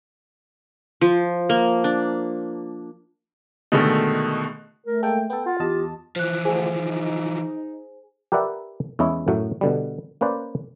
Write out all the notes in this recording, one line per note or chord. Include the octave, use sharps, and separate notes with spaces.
F3
A#3
D4
B2 D3 D#3 G#3 A3
A3 A#4
G#3 A#3 A4 G5
B3 A4 G5
F4 F#5
E2 G4 D#5 A5
E3 F3 C5 F#6
D2 G#4 C5 G#5
D#4
G4 A#4 B4 D5 E5 F#5
E2 G#3 C#4 E4 G#4
F#2 A2 F#3 A3
B2 D3 G3
A#3 C#4 B4 C5 D5